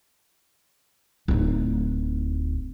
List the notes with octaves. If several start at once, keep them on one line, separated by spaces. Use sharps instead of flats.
D1 D#4